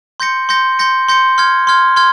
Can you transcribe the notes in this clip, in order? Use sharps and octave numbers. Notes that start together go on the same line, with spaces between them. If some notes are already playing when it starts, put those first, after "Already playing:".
C6 G6 A#6 C#7
C6 G6 A#6 C#7
C6 G6 A#6 C#7
C6 G6 A#6 C#7
C6 F6 G#6
C6 F6 G#6
C6 F6 G#6